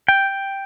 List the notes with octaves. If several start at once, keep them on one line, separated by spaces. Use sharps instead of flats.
G5